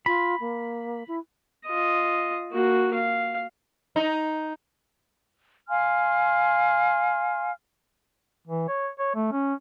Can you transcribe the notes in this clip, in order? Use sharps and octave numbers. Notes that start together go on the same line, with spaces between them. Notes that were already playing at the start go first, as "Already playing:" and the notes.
F4 B5
A#3
E4
F4 D#5
A#3 F#4
F5
D#4
F5 G#5 C6 F6
E3
C#5
C#5
A3
C#4